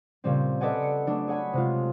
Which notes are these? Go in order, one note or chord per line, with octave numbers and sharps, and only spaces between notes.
A#2 C#3 G3 C4
A4 B4 D5 D#5 F#5 G#5
C#7
F#3 A3 D4
G#4 C#5 F#5 G#5 B5
C3 G#3 F4